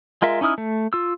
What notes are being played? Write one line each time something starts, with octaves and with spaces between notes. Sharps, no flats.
G#3 F4 A#4 E5
C#4 D#4 E4 D#6 F6
A3
F4 E6